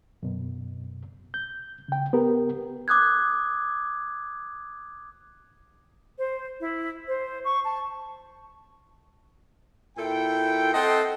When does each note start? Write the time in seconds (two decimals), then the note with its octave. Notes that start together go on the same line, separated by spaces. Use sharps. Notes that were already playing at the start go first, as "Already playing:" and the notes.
0.23 F#2 B2
1.34 G6
1.88 C#3 G5
2.13 B3 G4 A#4
2.88 D6 D#6 F#6 G#6
6.18 C5
6.60 E4
7.08 C5
7.44 C#6
7.64 A5
9.97 A#2 E4 A4 G5
10.74 C4 A4 D#5 F#5 A5 C6